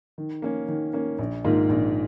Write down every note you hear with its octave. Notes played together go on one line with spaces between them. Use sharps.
D#3
A#3 C#4
D#3
A#3 C#4
A#1
G#2 D#3 A#3 F4
A#1